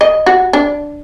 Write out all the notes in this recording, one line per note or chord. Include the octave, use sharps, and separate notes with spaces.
D#5
F#4
D4